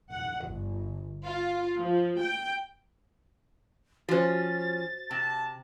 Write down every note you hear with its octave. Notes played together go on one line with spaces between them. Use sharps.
F#5
G1
F4
F3
G5
F3 C#4 F#4 C5 A6
C3 A5